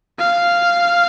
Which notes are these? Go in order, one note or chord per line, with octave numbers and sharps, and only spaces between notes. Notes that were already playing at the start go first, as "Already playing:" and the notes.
F5